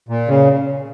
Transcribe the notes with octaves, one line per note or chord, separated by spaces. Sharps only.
A#2
C#3